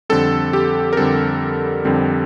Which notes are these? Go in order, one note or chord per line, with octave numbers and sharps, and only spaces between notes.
F2 D3 G3 C4 A4
G4
A#4
F2 D3 G3 C4 A4
F2 D3 G3 C4